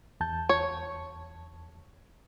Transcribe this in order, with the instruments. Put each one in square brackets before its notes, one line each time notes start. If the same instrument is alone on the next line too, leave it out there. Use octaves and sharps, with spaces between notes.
[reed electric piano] E2 A5 G6
[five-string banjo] C#5